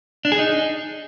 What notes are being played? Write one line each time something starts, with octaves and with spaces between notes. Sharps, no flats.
D4
G#4
D#4